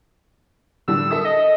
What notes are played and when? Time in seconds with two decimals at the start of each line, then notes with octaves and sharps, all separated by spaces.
0.88 A2 D3 G3 E6
1.10 A4 E5 D#6
1.25 D#5